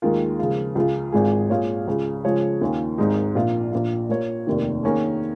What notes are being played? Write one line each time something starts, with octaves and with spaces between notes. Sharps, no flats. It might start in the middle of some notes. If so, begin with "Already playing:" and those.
D#2 D#3 G#3 F4 A#4
C#3 F3 G#3 F4
C#2 C#3 G#3 F4
G#1 G#2 G#3 F4 G#4
A#2 G#3 F4 C#5 F5
C#2 C#3 G#3
C#3 F3 G#3 F4 C#5
D#2 D#3 C#4 F4
G#1 G#2 G#3 D#4
A#1 A#2 A#3 F4
A#1 A#2 A#3 F4
A#2 A#3 F4 C#5
F1 D#2 D#3
D#3 A#3 C#4 G#4